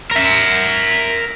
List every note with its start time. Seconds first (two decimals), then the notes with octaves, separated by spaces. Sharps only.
0.11 A#4 E5